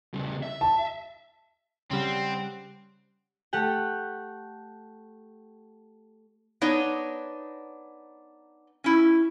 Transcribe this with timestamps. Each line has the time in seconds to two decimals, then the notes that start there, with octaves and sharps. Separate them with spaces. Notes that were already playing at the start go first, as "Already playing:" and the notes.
0.14 C#3 G3
0.43 E5
0.61 A5
1.91 C#3 G3 C4 F#5
3.53 A3 G4 F#5 G5
6.61 B3 D4 D#4 C#5
8.84 C#4 E4